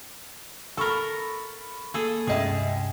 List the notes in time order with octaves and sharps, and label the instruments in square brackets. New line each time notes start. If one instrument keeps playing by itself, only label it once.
[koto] A4 A#4 [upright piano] B5 C#6
[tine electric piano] A#3 [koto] G#4 A4
[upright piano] C#2 D#5 E5 [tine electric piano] G2 C3 [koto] G#4 A5